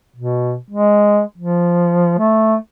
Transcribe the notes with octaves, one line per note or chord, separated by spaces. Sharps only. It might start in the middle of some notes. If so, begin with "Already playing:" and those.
B2
G#3
F3
A3